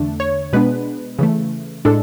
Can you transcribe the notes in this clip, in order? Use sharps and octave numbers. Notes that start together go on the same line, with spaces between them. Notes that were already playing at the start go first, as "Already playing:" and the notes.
Already playing: E2 D3 A3 D4
C#5
B2 G#3 B3 D4 B4
C#3 E3 A3
A2 G#3 D4 A4